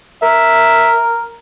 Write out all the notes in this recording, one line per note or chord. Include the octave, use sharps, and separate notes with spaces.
A#4 E5